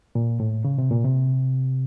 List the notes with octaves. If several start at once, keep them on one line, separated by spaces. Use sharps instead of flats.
A#2
A2
C#3
C3
A#2
C3